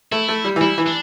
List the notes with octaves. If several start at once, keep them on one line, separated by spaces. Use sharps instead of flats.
A3 E4
A3
G3
E3
G3 E4
E3
D4